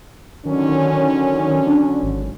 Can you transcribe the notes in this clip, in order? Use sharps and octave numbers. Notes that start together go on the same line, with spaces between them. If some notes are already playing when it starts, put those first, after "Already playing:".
D3 D#3 F#3 C#4
D4
G#1